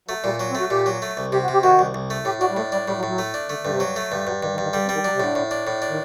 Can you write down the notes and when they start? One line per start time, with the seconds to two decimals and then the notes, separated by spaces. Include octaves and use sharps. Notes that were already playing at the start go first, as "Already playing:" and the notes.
0.08 F#3 A3
0.24 A#2 G3
0.40 F#3
0.50 C4
0.55 A3
0.60 F#4
0.70 A#2 G4
0.86 F#3
1.02 A3
1.17 C2
1.32 C3 G4
1.43 F#4
1.48 C3
1.53 G4
1.63 D#3 F#4
1.79 C2
1.94 C2
2.10 A3
2.25 A2 G4
2.41 D4 F#4
2.50 G3
2.56 A2 A3
2.72 G3 D4
2.87 A2 G3
2.97 F#3
3.03 A2
3.08 F#3
3.18 A3
3.34 D4
3.49 D3 A3
3.63 G2 D3
3.70 C3
3.80 F#3
3.96 A3
4.11 G2 D3
4.27 G2 F#3
4.42 G2 D#3
4.53 D#3
4.58 G2
4.63 D#3
4.73 D3 G3
4.84 C3
4.89 D#3 G3
5.04 F#3 D4
5.14 C3
5.20 A2 D3
5.35 A2
5.51 D4
5.67 A2
5.82 D4
5.90 D#3